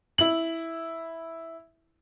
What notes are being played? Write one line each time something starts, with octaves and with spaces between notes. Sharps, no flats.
E4 F#7